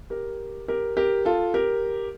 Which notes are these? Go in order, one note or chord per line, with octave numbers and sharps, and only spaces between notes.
G4 A#4
G4 A#4
G4 A#4
F4 A4
G4 A#4